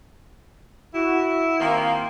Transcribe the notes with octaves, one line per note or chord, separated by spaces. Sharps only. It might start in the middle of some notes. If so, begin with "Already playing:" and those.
E4 F#4
D#3 A#3 C4 G5 C6